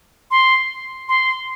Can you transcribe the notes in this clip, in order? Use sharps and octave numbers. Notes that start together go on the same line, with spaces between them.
C6
C6